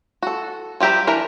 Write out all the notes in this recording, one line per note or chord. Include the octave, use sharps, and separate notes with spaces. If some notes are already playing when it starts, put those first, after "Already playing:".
F#4 A4
F3 G3 G4 E5 A#5
E3 D4 A#4